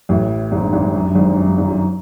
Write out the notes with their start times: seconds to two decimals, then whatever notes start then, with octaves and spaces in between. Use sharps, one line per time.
0.09 A1 A2
0.52 G#1 G#2
0.62 G2
0.73 G#1 G#2
0.84 G2
0.95 F#2
1.05 G2
1.15 G#1 G#2
1.26 G2
1.36 F#2
1.47 G2
1.58 G#1 G#2
1.67 F#2